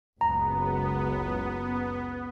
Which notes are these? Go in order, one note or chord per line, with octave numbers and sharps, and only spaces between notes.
F#1 C#2 F#3 B3 A#5